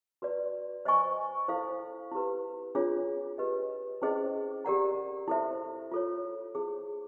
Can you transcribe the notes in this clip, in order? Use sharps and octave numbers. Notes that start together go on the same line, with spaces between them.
F#4 B4 D5
C5 D#5 G#5 C#6
E4 A4 C5 F5
E4 G4 B4
D4 F4 G#4 C#5
G4 B4 D#5
C#4 E4 G#4 C5 D#5
G4 A#4 D5 F#5 A#5
E4 A4 C5 E5
F4 A4 C#5
E4 G#4 C5